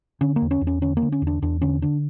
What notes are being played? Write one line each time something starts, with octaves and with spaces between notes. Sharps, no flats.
D3 C#4
A#3
E2
C#4
E2
C#4
D3 C#4
A#3
D3
C#4
E2
D4
E2 D4
D3 C#4
D3 D4